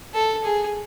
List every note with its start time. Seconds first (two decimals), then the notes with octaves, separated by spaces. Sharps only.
0.14 A4
0.44 G#4